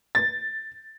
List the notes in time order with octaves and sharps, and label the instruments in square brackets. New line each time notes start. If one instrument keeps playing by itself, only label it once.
[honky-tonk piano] A6